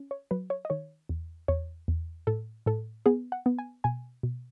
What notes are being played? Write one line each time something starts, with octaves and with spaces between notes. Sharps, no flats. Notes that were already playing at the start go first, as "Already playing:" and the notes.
Already playing: C#4
C#5
F#3 B4
C#5
D#5
D#3 C#5
E2
E2 C#5
E2
A2 A4
A2 A4
B3 G#4
F#5
B3
G#5
B2 G#5
B2